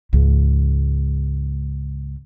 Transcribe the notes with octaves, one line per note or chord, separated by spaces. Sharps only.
C#2 G#2